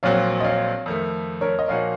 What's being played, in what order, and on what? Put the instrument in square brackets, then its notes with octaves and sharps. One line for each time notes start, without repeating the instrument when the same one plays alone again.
[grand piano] A#1 A#2 F#3 C4 F#4 [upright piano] C#5 F5
[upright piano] D#5
C#5 F5
[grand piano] F2 D#3 A3
[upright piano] A#4 C#5
D#5
[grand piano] A#2 F3 A#3 D#4 F#4 [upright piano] C#5 F5